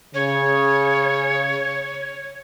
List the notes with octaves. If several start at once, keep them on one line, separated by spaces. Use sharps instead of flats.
C#3 C#5